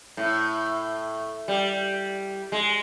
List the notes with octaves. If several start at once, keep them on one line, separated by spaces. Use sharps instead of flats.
A2
G3
G#3